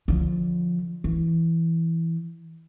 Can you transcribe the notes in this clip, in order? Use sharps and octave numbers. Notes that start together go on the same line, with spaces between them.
D3 F3
E3